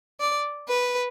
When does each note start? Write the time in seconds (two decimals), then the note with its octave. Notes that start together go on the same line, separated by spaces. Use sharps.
0.20 D5
0.68 B4